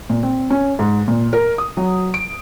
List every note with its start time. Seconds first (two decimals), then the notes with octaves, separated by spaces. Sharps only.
0.10 A#2
0.23 C4
0.50 C#4
0.79 G#2
1.08 A#2
1.33 A#4
1.58 D#6
1.77 F#3
2.14 D7